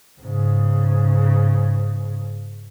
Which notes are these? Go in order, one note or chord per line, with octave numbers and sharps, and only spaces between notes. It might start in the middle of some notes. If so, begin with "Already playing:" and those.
G#2 C#3